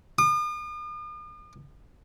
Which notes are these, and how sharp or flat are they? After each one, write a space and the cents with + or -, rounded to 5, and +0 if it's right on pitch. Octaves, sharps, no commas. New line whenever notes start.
D#6 -45